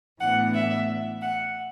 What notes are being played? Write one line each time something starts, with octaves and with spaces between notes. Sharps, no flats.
A2 E3 B3 D4 F#5
E5
F#5